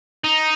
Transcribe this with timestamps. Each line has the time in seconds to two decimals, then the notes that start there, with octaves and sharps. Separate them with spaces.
0.24 D#4